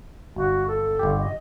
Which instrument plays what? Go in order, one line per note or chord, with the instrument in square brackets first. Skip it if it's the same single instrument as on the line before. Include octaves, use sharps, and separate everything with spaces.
[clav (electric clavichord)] G1 [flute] F#4
[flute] A4
[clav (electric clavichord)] G1 G4
[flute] D#5